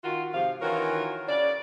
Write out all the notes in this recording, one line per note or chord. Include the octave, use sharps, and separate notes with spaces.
D#3 F4 F#4
G#2 C3 F3 F5
D#3 E3 C#4 F4 F#4 A#4
C#3 D5